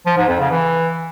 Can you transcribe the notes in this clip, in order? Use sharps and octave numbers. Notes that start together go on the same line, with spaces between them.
F3
G#2
F2
C#3
E3